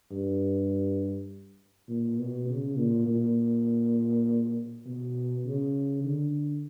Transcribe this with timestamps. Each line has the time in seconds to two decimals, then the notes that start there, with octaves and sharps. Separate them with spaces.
0.11 G2
1.89 A#2
2.18 B2
2.49 C#3
2.77 A#2
3.07 A#2
4.85 B2
5.45 C#3
6.04 D3